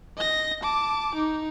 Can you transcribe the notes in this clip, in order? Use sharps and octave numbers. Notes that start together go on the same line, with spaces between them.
D#5 A#6
A5 D6
D#4